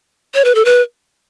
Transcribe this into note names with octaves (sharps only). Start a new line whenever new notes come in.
C#5
B4
A4
B4